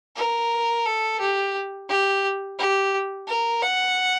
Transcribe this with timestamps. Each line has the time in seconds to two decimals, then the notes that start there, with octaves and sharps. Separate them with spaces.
0.16 A#4
0.86 A4
1.20 G4
1.89 G4
2.59 G4
3.28 A#4
3.62 F#5